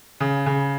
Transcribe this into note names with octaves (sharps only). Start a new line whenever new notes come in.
C#3
C#3